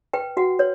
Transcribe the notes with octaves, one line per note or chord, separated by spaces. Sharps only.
B4 G5
F#4 F#5
B4 C#5